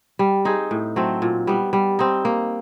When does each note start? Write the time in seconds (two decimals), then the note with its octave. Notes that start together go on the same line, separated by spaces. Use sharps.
0.19 G3
0.45 C4 D#4 G#4
0.71 A2
0.96 F#3 A3 C4
1.22 A#2
1.47 G3 B3
1.73 G3
1.99 C4 D#4
2.25 A#3